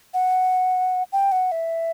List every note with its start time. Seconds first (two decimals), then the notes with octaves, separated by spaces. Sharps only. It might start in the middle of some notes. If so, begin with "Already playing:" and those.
0.14 F#5
1.12 G5
1.32 F#5
1.52 E5